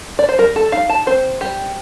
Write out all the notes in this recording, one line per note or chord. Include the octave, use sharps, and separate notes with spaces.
D5
C5
G3 A#4
A4
D#4 F5
A5
C4 C5
G3 G4